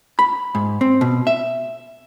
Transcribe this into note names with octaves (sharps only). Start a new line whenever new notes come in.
B5
G#2
C4
B2
E5